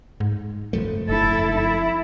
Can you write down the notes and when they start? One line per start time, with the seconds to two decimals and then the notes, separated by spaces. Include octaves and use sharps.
0.20 G#2
0.73 F#1 F3 A3
1.09 F1 E4 A4
1.56 E4